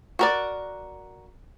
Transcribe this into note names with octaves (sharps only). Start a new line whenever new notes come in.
F#4 A#4 D5